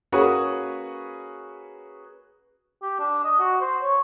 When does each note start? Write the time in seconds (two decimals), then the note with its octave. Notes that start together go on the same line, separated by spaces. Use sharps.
0.12 A#3 C#4 F#4 G#4 B4 C#5
2.82 G4
2.99 D4
3.24 D#5
3.39 F#4
3.61 C5
3.82 C#5